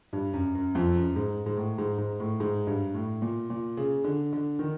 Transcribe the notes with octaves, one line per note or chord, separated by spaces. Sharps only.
G2
F#2
F#2
F2
F#2
G#2
G#2
A2
G#2
G#2
A2
G#2
G2
A2
A#2
A#2
C#3
D3
D3
D#3